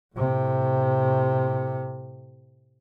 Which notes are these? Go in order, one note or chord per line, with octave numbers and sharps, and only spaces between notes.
A2 C3